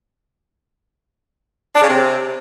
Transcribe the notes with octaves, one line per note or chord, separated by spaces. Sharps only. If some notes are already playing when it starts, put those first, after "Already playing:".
D4
C#3
C3